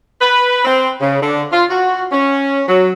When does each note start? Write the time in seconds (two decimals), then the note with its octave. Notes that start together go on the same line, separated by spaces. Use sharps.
0.20 B4
0.65 C4
1.00 C#3
1.21 D3
1.52 F4
1.70 F#4
2.12 C#4
2.68 F#3